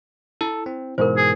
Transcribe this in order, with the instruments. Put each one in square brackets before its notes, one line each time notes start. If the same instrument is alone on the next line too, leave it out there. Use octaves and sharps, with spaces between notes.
[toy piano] E4 [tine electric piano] A4
[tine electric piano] C4
[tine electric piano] G#2 B2 E3 [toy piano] A#4 C5
[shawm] G#4